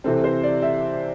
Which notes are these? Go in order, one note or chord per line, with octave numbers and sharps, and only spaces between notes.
C3 E3 C4 A4
C5
D5
E5